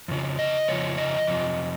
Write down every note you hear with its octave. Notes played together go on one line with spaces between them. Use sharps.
F2 C#3 F3
D#5
F2 C#3 F3 C#5
D#5
F2 C3 F3